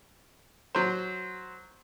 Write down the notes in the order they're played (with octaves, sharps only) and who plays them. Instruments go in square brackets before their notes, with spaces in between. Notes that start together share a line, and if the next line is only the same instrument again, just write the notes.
[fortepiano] F#3 C5